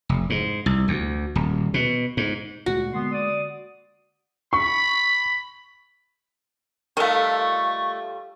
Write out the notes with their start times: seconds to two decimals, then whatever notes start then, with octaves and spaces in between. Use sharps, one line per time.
0.09 F1
0.30 G#2
0.66 C2
0.88 D2
1.35 D#1
1.74 B2
2.17 G#2
2.66 D2 A#2 G#3 F#4
2.94 D3 G#3 A#3 B3 C6
3.12 D5 D#6
4.53 B5 C#6
6.97 D#3 G3 A3 F4 A4 F5 A5 C#6